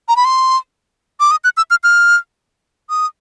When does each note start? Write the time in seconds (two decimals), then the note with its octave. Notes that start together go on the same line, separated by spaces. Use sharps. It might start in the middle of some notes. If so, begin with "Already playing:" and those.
0.08 A#5
0.16 B5
0.25 C6
1.20 D6
1.31 D#6
1.44 F#6
1.57 E6
1.71 F6
1.84 F6
2.90 D#6